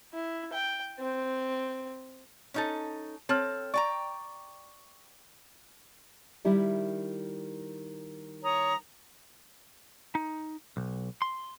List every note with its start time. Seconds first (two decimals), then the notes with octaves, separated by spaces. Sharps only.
0.13 E4
0.53 G5
0.99 C4
2.54 C#4 D#4 A4
3.29 C4 A4 C#5 F6
3.74 D5 G5 A#5 C#6
6.45 D#3 G3 E4
8.43 C#5 A#5 D#6
10.15 D#4
10.77 B1
11.22 C6